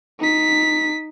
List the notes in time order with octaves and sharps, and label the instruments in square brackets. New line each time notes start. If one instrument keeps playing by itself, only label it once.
[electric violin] D#4 B6